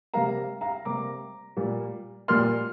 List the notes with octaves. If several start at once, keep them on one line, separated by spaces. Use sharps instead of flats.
C3 G3 A#3 F5 A#5
F5 A#5
C3 G3 A#3 A#5 D6
A#2 G3 A#3
A#2 G3 A#3 C6 F6